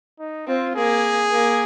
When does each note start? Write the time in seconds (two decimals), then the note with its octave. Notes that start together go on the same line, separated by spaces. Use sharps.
0.19 D#4
0.47 C4 F4
0.75 A#3 G#4
1.32 A#3